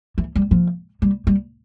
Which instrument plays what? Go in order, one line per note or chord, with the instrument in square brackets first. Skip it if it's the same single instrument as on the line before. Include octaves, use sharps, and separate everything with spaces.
[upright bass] E3
G3
F3
G3
G3